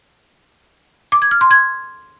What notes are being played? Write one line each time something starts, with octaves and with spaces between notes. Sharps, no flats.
D6
G#6
F6
C6
G#6